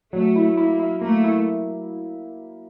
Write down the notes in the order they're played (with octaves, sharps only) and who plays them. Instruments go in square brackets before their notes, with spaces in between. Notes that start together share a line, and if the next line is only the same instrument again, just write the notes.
[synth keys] F#3 [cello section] A3
[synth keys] E4
[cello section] A#3 [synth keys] E4
[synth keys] E4
[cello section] A3 [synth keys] A#3
[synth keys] E4